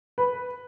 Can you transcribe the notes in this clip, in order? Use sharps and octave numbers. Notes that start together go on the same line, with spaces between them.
B4